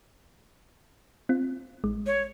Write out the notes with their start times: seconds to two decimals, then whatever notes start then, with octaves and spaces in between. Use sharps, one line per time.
1.29 C4 F4
1.84 A1 G#3
2.06 C#5